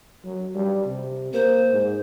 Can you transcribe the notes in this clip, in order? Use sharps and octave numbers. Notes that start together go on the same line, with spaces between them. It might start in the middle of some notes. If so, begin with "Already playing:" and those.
F#3
G3
C3
A#3 C5
G#2